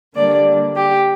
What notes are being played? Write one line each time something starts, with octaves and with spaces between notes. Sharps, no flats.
D3 G3 A#3 D4 D5
G4